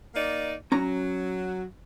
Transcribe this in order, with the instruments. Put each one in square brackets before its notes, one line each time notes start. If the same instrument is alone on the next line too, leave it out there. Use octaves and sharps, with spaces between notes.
[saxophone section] A#3 D#4 D5
[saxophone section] F#3 [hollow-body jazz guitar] C#4 A#5